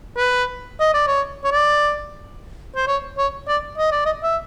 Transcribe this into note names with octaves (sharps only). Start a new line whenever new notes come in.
B4
D#5
D5
C#5
C#5
D5
C5
C#5
C#5
D5
D#5
D5
D#5
E5